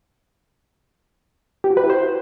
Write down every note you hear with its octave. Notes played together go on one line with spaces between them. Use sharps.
G4
F#4
B4
E4
C5